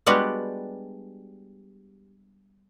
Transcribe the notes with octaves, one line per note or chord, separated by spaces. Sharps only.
G3 G#3 B3 D4 F#4 G4